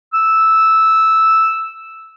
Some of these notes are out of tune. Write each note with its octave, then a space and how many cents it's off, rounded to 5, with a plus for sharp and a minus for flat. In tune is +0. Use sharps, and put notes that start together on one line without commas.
E6 -5